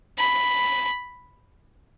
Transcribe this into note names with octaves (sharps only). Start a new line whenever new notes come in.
B5